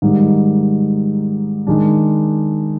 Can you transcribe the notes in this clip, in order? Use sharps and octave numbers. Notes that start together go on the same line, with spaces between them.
G#2 D#3 G3
D#3 G#3 D4